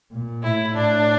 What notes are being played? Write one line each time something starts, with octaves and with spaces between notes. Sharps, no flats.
A#2
A2 E4
A2 D4